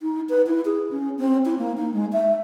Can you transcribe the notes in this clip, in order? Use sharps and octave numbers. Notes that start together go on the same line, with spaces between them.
D#4
B4
E4
G#4
C#4
C4
E4
A#3
D#4
G#3
E5